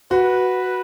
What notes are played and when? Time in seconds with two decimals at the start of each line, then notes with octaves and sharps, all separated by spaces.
0.11 F#4 B4